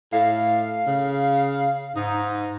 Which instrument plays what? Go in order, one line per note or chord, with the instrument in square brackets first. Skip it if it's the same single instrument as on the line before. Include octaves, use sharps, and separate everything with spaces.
[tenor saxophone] A2 [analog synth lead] F5
[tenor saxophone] C#3
[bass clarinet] G#2 [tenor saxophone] D#4